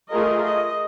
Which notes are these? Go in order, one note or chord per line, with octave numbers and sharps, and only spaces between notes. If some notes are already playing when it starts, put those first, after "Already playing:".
A3 F4 G#4 A#4 D#5
D#5